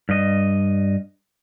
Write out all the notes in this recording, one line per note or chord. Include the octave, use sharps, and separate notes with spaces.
G2 D#5